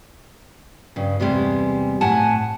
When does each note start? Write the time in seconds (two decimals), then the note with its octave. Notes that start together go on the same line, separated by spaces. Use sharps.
0.96 G2 C#3
1.20 E2 C3 G3 G#3
2.01 A2 F#5 G#5 A5